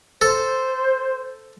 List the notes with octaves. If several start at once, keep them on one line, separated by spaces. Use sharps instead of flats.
A4 C5